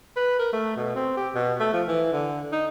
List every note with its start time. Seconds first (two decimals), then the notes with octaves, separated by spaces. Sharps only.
0.16 B4
0.39 A#4
0.53 A3
0.76 B2
0.96 C4
1.17 G4
1.35 B2
1.60 A3
1.73 F3
1.88 E3
2.13 D3
2.52 D#4